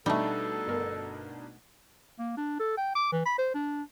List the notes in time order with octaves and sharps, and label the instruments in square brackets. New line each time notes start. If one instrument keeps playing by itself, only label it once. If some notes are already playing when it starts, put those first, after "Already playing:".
[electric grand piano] B2 D4 D#4 [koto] G3 A3 [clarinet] A4
[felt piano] G1 A#4
[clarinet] A#3
D4
A4
G5
D6
E3
B5
C5
D4